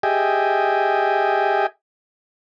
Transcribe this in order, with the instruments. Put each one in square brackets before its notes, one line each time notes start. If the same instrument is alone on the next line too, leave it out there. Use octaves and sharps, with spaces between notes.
[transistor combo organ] G4 G#4 D#5 E5 G5 G#5